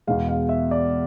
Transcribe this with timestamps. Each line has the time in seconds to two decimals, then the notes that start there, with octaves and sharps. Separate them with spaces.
0.07 E2 B2 G#3 F5
0.29 F5
0.49 E5
0.71 D5